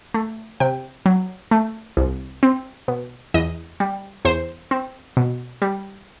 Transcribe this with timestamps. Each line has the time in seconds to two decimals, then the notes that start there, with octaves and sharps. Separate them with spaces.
0.14 A3
0.60 C3 G5
1.06 F#3
1.51 A3
1.97 C2
2.43 C4
2.88 B2
3.34 E2 D#5
3.80 G3
4.25 E2 C5
4.71 C4
5.17 B2
5.62 G3